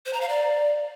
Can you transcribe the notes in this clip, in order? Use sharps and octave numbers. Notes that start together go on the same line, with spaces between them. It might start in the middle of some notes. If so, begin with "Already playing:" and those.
C5
A#5
F5
D5